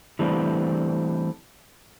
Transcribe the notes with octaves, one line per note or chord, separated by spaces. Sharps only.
E3 G3 A3 C4 D4